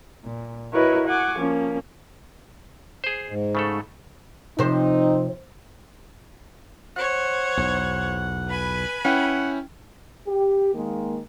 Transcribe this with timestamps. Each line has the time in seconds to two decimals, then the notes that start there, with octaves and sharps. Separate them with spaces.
0.24 A#2
0.72 E4 F#4 A#4 B4 C#5 D#5
1.06 F#5 G#5 C#6 D6
1.37 F3 A#3 C#4
3.04 G#4 C5
3.28 G#2
3.55 C#3 A3 A4
4.59 C3 F3 C4 D#4 C5
6.97 C5 C#5 F#5
7.57 B1 E2
8.49 B4 G#5 B5
9.05 C#4 E4 F#5 G5
10.27 G4
10.74 D#3 G#3 A#3